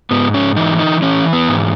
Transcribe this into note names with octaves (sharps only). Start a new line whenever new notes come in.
G#2 B3
C#4
E3 D#4
D#4
E3 C#4
B3
G#2